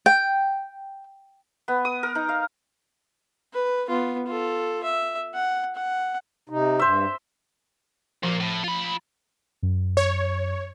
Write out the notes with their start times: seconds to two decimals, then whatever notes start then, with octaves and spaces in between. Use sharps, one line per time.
0.06 G5
1.68 B3
1.85 D#6
2.03 A#4
2.15 D#4
2.29 F5
3.53 B4
3.88 B3 F4
4.26 F4 A4
4.83 E5
5.35 F#5
5.76 F#5
6.50 C3 D#4
6.79 G2 C5 E5
8.23 A#2 F3 A#3
8.40 A2
8.64 F4 B5
9.63 F#2
9.97 C#5